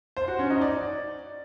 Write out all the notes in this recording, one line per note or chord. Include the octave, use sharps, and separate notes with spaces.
C5
F#4
C#4
D#4
D5